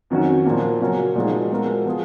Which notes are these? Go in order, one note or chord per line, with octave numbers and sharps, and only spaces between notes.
F2 D#3 F#3 C#4 F#4
A#2 F3 A#3
C#3 F#3 C#4 F#4 A#4
A#2 F3 G#3 D#4 F#4
F3 G#3 B3 F#4 A#4
F3 B3 F4 G#4